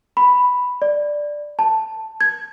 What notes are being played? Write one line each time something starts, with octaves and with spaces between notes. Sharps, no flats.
B5
D5
A5
G#6